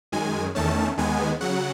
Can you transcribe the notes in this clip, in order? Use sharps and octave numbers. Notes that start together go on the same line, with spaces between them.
F#2 D#3 G#3 G#5
E2 D#3 A3 C#4 A5
D#2 D#3 G#3 B3 G#5
C#3 F#3 F#5